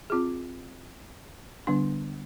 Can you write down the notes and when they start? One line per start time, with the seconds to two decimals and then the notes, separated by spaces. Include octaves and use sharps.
0.10 C4 F4 G#4
1.67 D3 G3 B3 D4